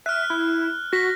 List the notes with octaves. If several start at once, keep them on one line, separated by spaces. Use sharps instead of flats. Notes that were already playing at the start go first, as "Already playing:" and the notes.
E5 F6 F#6
E4
F#4 A#6 B6